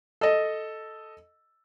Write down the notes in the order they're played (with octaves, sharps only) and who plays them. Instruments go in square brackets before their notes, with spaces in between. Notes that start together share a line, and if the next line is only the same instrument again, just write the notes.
[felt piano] A4 D#5